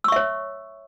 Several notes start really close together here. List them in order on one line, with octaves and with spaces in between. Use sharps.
E6 C#6 E5 C#5